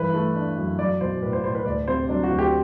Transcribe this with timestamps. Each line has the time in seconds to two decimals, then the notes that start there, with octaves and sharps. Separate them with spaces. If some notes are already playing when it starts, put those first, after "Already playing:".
Already playing: G2 E3 B4
0.13 A3
0.36 D4
0.57 F#2
0.79 F#3 D5
1.00 B1 C5
1.22 A2 B4
1.33 C5
1.43 A2 C5
1.55 B4
1.66 D2 D5
1.87 C3 C5
2.09 F#3 D4
2.23 F#4
2.30 D2
2.38 G4